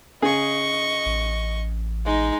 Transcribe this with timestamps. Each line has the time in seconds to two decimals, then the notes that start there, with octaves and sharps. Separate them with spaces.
0.22 C#3 G#4 D#5 C#6
1.06 A1
2.05 G#3 D#4